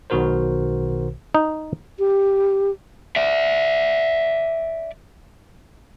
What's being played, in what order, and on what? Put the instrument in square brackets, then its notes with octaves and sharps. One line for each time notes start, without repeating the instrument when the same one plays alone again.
[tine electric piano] B1 B2 D#3 F#4 A#4 C5
[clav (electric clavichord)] D#4
[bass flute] G4
[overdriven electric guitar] D5 E5